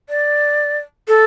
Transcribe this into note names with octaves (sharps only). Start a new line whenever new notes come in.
D5
A4